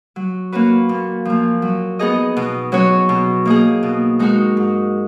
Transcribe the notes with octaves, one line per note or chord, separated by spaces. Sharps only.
F#3
A#3 C#4 F#4 B4
A#2
F3 A#3
F#3
B3 D#4 G#4 D#5
B2
F#3 C#4 F#4 C#5
B2
A#3 D#4 G#4
B2
G#3 D#4 F#4 A#4
G#2